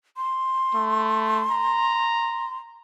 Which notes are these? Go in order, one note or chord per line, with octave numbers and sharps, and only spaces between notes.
C6
A3
A#5